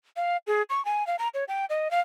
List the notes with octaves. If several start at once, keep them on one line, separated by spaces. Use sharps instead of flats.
F5
G#4
C#6
G#5
F5
A#5
C#5
G5
D#5
F5